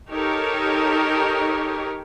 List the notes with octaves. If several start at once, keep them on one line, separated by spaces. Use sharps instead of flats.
D#4 G4 A4 A#4 C#5